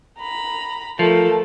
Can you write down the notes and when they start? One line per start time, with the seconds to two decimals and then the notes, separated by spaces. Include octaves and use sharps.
0.19 A#5 B5
0.99 F3 A3 A#4